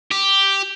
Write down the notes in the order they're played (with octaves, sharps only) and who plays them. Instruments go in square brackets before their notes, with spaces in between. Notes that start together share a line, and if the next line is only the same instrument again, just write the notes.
[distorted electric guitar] G4